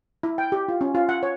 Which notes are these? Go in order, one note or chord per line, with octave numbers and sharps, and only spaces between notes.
E4
G5
G4
F4
C#4
F4
F#5
C#5